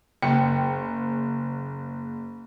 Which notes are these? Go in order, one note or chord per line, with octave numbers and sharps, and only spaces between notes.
F#1 G5